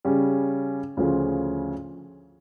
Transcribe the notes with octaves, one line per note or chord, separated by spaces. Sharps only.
C#3 G3 C#4
D2 C#3 F3 C#4